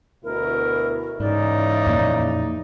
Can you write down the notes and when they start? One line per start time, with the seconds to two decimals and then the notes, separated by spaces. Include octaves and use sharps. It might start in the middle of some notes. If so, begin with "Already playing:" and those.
0.24 D2 B2 E4 A#4
1.20 G#2 C#3 E3 D#4 D5
1.86 F2 A#2 A#3